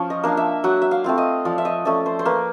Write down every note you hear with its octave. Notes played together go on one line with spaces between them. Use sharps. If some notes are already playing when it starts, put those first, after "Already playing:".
Already playing: F3 C#4 F4 C#5
D#5
A#3 D4 F5
E5
F#3 F#5
E5
F5
A3 C4 F4
D#5
F3 D5
E5
D#5
A3 C#4 D5
C5
C5
A#3 B4